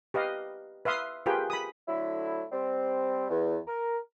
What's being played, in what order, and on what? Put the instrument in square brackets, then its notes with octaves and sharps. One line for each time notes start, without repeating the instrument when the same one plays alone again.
[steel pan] G4 B4 D#5 F5
B4 E5 F5 C6 D#6
F4 G4 G#4 A#4 B4 G5
B5 D#6
[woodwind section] D3 F#3 A3 E4
G3 C4
E2
A#4